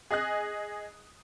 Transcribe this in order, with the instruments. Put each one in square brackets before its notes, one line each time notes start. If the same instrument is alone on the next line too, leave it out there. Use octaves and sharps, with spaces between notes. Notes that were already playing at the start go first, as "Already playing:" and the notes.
[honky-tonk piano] G#4 D#5 G#5 D#6 F#6